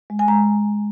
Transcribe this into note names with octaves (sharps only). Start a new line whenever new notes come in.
G#3
G#5
G#3 A#5